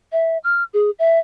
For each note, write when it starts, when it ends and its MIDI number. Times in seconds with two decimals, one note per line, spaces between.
0.12 0.38 76
0.44 0.64 89
0.73 0.90 68
0.99 1.19 76